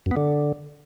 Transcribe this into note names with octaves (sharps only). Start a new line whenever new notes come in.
F#2
B3
D3